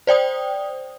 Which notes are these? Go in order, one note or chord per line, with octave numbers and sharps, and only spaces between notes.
C5 D5 G5 D#6